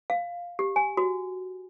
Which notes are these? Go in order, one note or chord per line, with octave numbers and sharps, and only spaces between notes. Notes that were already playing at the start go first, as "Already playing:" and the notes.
F5
G4
G#5
F#4